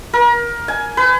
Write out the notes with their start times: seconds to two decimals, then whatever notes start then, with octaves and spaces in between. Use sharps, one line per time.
0.13 A#4
0.68 G#5
0.97 B4